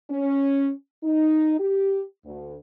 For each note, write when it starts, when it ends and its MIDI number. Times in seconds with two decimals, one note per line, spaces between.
0.11 0.71 61
1.03 1.55 63
1.60 2.02 67
2.25 2.56 38